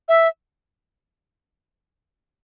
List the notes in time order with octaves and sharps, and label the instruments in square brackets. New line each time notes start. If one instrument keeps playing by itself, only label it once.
[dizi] E5